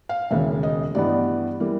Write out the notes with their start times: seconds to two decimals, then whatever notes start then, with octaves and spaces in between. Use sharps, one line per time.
0.09 F5
0.31 E1 D#2 C#3 E5
0.63 D#5
0.95 G2 E3 G3 B3 D5
1.60 E3 G3 A#3